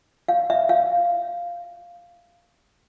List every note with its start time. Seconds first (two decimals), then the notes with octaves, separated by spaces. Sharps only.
0.28 F5
0.50 E5
0.69 F5